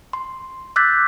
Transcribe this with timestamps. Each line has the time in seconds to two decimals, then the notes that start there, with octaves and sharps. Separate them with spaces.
0.13 C6
0.76 D6 E6 F#6 G6 A6 B6